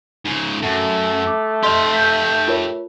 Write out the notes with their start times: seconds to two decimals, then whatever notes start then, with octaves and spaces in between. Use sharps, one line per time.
0.25 G#2 C#3
0.62 F#2 A3
1.27 D6
1.63 G4 D#5 F5 C6
1.93 G6 B6
2.48 F4 A#4 C#5